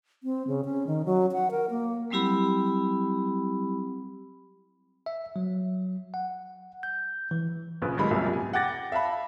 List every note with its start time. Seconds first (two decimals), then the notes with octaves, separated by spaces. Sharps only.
0.23 C4
0.47 C#3
0.65 C#4
0.87 D#3
1.05 F#3
1.32 F#5
1.51 A#4
1.70 A#3
2.10 F#3 G3 C4 E4 G4 B5
5.06 E5
5.36 F#3
6.14 F#5
6.83 G6
7.31 E3
7.82 A#1 C#3 B4
7.97 D#2 G3 G#3 B5
8.10 C2 F#2 A#2 C#3 G3 A#3
8.33 G#5
8.53 F#5 G5 D6 A6 A#6
8.92 E5 F5 A5 B5